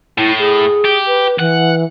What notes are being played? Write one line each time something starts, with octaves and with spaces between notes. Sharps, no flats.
A2 E4
G#4
G4
B4
E3 F#5